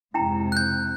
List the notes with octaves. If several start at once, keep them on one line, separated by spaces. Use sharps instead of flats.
F2 G#2 C3 E4 G5 A#5
F#6 G6